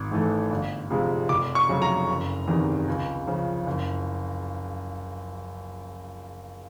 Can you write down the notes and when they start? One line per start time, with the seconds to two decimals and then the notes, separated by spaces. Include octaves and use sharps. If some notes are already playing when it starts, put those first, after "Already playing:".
Already playing: G#1
0.11 G#2 E3 A3
0.50 G1
0.90 F2 C3 F3 G#3
1.29 F1 D6
1.55 C#6
1.69 F2 C#3 F#3
1.82 A#5
2.08 F#1
2.47 E2 C3 D#3
2.88 C#2
3.27 C#3 F3
3.67 F#1